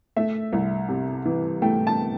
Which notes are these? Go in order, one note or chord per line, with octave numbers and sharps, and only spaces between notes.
A3 E5
C2
C3
E3
A3 G5
A5